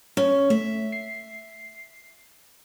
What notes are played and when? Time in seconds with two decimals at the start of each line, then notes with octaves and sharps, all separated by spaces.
0.17 C#4
0.50 A3 E5
0.92 C7